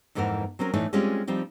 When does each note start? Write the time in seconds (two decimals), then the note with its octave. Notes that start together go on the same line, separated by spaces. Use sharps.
0.15 F2 G#2 E3 A#3 A#4 F#5
0.59 F#3 C4 C#4 A#4
0.74 A2 E3 A3 D4 D#4
0.93 G3 G#3 C4 C#4 F4 G4
1.27 F3 G3 C4 D#4